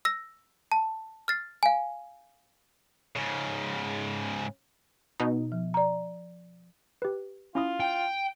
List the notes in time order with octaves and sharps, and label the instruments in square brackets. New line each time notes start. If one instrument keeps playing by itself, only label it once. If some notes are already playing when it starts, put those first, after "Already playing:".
[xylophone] E6 A#6
A5
F6 A6 C7
F5 G#5
[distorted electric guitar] G#2 C#3
[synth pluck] B2 D#4
[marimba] F3
D5 A#5
[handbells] G4 B4
[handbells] C#4 E4 D#6 [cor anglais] F4
[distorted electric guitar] G5